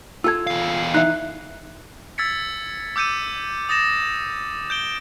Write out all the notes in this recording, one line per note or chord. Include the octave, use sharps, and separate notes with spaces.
F4 A4 E6 G#6
E2 F5
E3 D#4 E5 F#6
E6 G#6 A6 B6 C#7
D6 E6 G6 C#7 D#7
D#6 A6 A#6 E7
G6 D7 G7